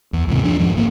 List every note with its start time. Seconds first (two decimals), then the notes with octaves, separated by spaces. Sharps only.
0.13 E2
0.28 D#2 G#2 C3
0.43 G2 F3 D4
0.59 F2 G#2 F3 G#3
0.74 G#1 A#3